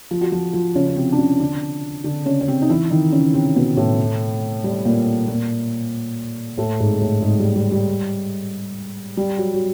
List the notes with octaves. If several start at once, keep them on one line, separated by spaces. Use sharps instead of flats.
F3 F4
F#4
F3 F4
F3 F4
C#3 C#4
C#4
C3 C4
D4
C#3 C#4
D3 D4
D3 D4
C#3 C#4
C#4
C3 C4
D#4
E3 E4
D#3 D#4
C#3 C#4
C3 C4
B2 B3
A2 A3
G3
A#2 A#3
A#2 A#3
A2 A3
G#2 G#3
A2 A3
G#2 G#3
G3
G3
G3
G3
F#3
F#3